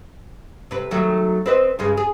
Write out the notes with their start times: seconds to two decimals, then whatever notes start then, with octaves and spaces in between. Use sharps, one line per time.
0.71 C3 B4
0.91 D#3 F#3 A3
1.46 C4 B4 D#5
1.79 G2 C#3 G#3
1.97 G#4